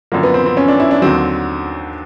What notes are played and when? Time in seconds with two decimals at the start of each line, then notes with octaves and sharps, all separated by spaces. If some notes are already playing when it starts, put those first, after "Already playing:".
0.12 F#2 D3 F3 A#3
0.23 B3
0.34 C4
0.46 C4
0.57 C#4
0.68 D4
0.80 E4
0.91 D4
1.02 D#2 D3 F#3 C4